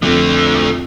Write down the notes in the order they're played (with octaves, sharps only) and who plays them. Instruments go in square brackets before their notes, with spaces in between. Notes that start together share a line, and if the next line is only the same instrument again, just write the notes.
[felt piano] F2 C4 [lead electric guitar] D3 A3